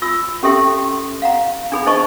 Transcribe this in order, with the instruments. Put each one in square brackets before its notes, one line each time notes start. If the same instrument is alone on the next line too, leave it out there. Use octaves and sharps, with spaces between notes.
[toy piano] F4 E6
C#4 G4 A4 E5 G5 C6
F5 F#5 A#5
D4 G#4 B5
D#4 C5 D#5 A5 C#6